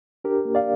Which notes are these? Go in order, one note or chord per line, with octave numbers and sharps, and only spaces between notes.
D4 G4 A#4
A#3
D5 F5